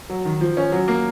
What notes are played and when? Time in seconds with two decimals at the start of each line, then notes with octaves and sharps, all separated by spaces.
0.10 F#3
0.25 D#3
0.41 F3
0.57 C#4
0.72 F#3
0.88 A#3